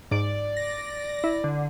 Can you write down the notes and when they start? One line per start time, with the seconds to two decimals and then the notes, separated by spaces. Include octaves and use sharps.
0.11 G#2 D5 D7
0.57 A#6
1.24 E4
1.44 D3